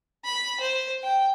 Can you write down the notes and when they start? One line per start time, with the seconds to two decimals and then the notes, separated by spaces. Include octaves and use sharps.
0.25 B5
0.60 C5
1.03 G5